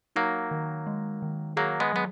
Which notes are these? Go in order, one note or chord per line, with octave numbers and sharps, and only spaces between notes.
F#3 A#3 D#4
D#3
G#3
D#3
F#3 A#3 G#4
G#3 B3
F#3 B3